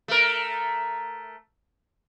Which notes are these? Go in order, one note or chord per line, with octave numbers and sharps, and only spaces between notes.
A3 A#4